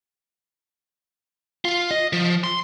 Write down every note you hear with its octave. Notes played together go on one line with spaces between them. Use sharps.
F4
D#5
F3
C6